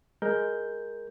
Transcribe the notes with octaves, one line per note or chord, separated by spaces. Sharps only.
G#3 A#4 G6